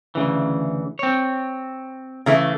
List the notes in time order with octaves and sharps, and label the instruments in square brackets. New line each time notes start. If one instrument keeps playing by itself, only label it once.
[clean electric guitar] D2 C#3 E3
C4 C#5
[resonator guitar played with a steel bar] C#3 E3 A3